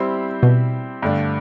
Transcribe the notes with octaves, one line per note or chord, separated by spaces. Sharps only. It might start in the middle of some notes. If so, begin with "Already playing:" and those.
Already playing: G3 C4 E4 G4 C5
B2
G2 D3 A3 D4